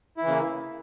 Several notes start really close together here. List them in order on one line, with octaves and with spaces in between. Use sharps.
E4 E3 C#3 A#3